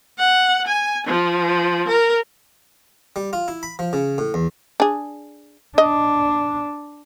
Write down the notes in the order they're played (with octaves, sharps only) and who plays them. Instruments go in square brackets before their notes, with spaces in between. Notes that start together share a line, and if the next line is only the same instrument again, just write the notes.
[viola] F#5
G#5
F3
A#4
[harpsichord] G3
F4
E4
B5
F3
C#3
A2
E2
[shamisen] D4 G#4
[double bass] D4 [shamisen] D#5